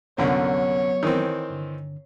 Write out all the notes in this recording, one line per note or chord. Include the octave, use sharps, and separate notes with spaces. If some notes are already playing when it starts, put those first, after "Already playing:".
C2 F#2 D3 F#3 B3 C#5
D#3 E3 C4
G2 D3